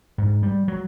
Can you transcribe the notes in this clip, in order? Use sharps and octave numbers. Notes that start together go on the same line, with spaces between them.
G#2
G3
F#3